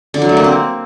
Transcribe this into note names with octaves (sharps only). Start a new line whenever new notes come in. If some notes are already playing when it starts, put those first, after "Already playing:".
D3
F#3
A3
A#3
C4